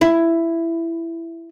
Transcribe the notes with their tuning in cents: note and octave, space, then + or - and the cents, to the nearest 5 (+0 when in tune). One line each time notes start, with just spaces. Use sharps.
E4 +10